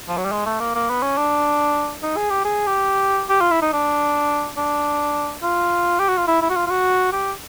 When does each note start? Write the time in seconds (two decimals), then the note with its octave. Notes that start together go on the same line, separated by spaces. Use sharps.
0.08 F3
0.17 F#3
0.25 G3
0.32 G#3
0.46 A3
0.60 A#3
0.75 A#3
0.89 B3
1.02 C#4
1.17 D4
2.03 D#4
2.17 G#4
2.30 G4
2.45 G#4
2.67 G4
3.29 G4
3.41 F4
3.51 E4
3.62 D#4
3.73 D4
4.57 D4
5.43 F4
5.99 G4
6.08 F#4
6.18 F4
6.28 E4
6.42 E4
6.50 F#4
6.56 F4
6.67 F4
6.70 F#4
7.13 G4